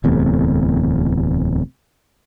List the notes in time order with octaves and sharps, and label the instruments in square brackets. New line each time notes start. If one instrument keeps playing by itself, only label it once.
[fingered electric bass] D1 E2 C3 A3